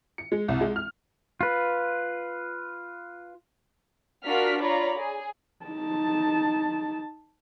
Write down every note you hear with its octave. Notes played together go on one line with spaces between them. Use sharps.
C#7
G#3
C2
G#3
F6
F4 B4
D4 F4 F#4 A#4 F6 B6
F4 C#5 D5 A#5 B5
G#4
D#4 A5